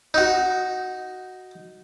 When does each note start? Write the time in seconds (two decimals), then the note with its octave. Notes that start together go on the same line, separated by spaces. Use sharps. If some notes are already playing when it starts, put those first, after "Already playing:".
0.14 D#4 F#4